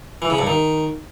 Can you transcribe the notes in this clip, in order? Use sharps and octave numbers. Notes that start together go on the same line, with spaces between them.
E3
C#3
G2
D#3